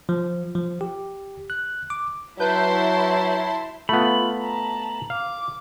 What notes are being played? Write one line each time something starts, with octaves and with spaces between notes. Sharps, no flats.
F3
F3
G4
F#6
D6
F#3 E4 B4 A5 C6 G6
A3 B3 F4 B5
A5 A#5
F5 D6